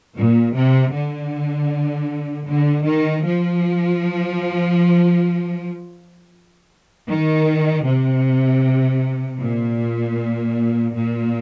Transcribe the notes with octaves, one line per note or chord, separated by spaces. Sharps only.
A#2
C3
D3
D3
D#3
F3
D#3
C3
A#2
A#2